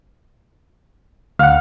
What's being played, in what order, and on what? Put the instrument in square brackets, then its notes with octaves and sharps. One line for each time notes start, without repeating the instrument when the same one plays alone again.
[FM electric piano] D2 F#5 [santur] F5